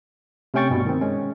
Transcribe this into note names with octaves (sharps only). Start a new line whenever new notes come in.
C3 A3 C#4 G5 C#6 A6
G2 B2 G3
D#3 C4
G#3 C#4